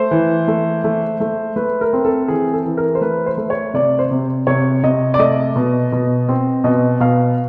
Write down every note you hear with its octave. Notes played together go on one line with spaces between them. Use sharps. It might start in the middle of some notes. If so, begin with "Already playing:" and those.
Already playing: A3 C5
E3
A3
A3
A3
A3 B4
A#4
C4
A4
E3 G#4
A4
E3
A#4
C5
A3 B4
C5
A3
C#5
C3 D5
C5
C3
C3 C#5
C3 D#5
D5
A3 D#5
B2
B2
C4
B2 D#5
B2 F5